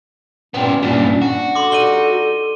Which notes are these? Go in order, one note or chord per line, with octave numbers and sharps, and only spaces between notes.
A#2 B3 C#4 G4
G2 A#2 D4
F#4
A4 C6 D6
G3 D#4 D#7 G7